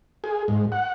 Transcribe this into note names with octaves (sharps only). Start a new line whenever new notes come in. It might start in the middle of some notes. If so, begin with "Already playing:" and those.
G#4
G#2
F#5